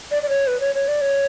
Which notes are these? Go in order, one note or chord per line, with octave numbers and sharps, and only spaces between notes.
D5
D5
C#5
B4
C#5
C#5
D5
C#5